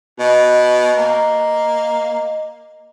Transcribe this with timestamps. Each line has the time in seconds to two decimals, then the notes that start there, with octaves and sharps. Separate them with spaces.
0.19 B2 D#5
0.97 A#3